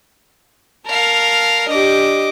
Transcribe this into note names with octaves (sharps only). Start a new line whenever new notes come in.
A#4 F5 A5
D4 G4 D#5 D6